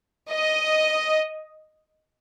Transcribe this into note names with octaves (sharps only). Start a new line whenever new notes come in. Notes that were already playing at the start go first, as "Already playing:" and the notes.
D#5